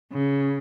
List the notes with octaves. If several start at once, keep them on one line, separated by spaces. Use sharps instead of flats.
C#3